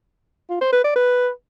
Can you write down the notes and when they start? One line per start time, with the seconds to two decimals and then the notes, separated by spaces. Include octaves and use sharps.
0.50 F4
0.61 C5
0.73 B4
0.84 D5
0.95 B4